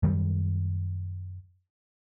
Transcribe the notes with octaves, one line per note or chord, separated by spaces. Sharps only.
F#2 D#3 G3